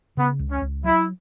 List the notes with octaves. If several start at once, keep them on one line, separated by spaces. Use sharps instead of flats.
C#3 B3
C#2
C#4
C#2
F#3 E4